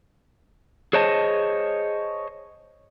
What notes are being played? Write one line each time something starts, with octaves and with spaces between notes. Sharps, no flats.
G#4 C5 C#5 D#5 A5